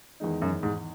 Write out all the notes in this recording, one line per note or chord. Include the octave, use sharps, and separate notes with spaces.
E2 D#3 G#3 D#4
F#2
G#2